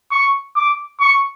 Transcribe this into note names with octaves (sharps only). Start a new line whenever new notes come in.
C#6
D6
C#6